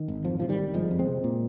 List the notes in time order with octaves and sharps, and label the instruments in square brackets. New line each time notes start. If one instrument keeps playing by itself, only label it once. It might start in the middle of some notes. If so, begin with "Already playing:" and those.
Already playing: [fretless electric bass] D#3
G#1
F2 F3
C3 F3
D#3 G3
G1
G1 F3 G#3
F2
G#3 C4
C3
A#2